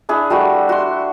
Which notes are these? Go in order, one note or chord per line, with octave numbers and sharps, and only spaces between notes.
D4 E4 G#4
G3 A3 F#4
F#4 C6